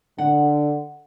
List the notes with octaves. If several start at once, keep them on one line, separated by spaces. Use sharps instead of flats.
D3 F#5